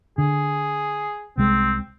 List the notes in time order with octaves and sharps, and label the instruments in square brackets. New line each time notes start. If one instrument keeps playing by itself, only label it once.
[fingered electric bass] D3 [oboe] G#4
[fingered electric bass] C2 G#3 [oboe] C4